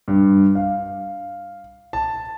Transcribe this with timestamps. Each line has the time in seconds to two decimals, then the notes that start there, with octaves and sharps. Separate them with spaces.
0.08 G2
0.55 F5
1.93 A5